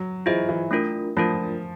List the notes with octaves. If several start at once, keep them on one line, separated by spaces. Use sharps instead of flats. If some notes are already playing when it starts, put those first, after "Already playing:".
Already playing: F#3
E3 F4 G#4 C5 D#5
E3
A3 D4 F4 A#4
F3 A3 D4 F4 A#4